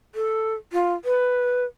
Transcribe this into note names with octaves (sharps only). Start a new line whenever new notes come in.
A4
F4
B4